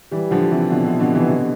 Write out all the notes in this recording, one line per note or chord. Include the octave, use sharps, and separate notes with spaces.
E3 G3
D3 F3
C3 E3
B2 D3
C3
B2 D3
C3 E3
B2 D3